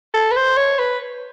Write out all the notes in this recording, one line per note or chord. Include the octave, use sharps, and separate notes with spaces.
A4
B4
C5
C#5
B4